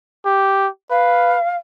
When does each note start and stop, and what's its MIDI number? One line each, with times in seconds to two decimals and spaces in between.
0.25 0.68 67
0.90 1.37 71
0.90 1.56 77